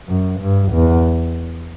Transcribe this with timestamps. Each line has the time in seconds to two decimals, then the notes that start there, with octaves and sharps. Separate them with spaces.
0.08 F#2
0.40 G2
0.73 E2